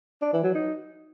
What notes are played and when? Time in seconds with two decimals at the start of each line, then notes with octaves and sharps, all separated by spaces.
0.22 D4
0.33 E3
0.44 F#3
0.55 D#4